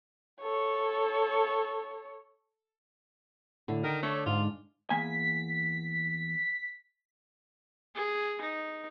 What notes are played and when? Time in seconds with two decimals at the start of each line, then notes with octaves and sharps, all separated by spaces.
0.42 A4 C#5
3.68 A2 D3
3.84 D#3 A#4
4.03 A3 D4 C#5
4.26 G#2 F4
4.90 E2 A#3 G#5 B6
7.95 G#4
8.41 D#4